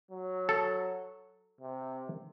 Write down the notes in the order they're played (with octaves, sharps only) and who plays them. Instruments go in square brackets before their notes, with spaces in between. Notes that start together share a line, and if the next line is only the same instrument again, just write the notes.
[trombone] F#3
[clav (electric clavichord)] A4
[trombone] C3